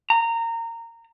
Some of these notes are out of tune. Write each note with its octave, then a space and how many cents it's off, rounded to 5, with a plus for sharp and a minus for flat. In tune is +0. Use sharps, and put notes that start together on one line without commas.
A#5 -20